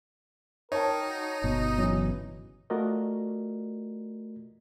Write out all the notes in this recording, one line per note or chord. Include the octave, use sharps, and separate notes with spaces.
D#4 A#4 C#5 G5 A5
F#4
G1 B2 D#5
C#3 E3 F#3
A3 F4 F#4 A#4 D5 D#5